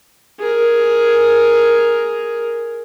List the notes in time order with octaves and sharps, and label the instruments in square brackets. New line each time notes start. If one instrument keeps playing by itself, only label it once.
[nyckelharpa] G#4 A#4